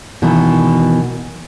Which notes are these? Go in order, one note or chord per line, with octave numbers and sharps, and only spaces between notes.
B2 D#3 E3